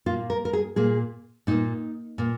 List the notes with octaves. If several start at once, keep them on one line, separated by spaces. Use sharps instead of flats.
A#2 A#3 F4
A#4
A#4
G#4
A#2 A#3 G#4
A#2 A#3 D#4
A#2 A#3